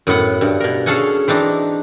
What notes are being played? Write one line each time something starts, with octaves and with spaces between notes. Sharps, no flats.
F#2 A2 B3 F#5
G2
B2 A#4
C#4 G#4 A4 F5 F#5 G#5
E3 C4 D4 D#4